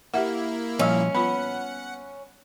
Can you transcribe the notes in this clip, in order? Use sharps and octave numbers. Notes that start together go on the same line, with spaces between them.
A#3 E4 G4 E5 F#5
A#2 F3 G3 C#4 D#5 F5
B3 F4 F#5 B5